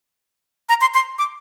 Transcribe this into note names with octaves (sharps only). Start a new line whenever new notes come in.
A#5
C6
C6
D6